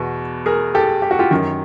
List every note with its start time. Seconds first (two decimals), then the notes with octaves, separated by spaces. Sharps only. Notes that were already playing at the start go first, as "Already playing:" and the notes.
Already playing: E2 B2
0.46 G#4 A#4
0.75 G4 A4
1.02 G4
1.11 F#4
1.19 F4 G4
1.31 F#2 D#3